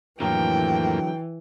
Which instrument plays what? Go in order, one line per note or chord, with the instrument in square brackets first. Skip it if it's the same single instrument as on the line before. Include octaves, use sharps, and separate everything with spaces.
[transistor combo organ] F2 A2 A#3 [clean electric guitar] D3 F#3 A#4 [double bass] E3 [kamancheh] G5